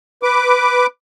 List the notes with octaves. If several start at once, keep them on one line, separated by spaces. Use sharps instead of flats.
B4 D6